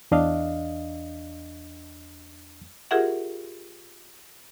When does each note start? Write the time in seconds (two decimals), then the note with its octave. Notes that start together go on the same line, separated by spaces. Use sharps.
0.11 E2 D4 D#5 F5
2.91 F4 G4 G#4 A#4 E5 F#5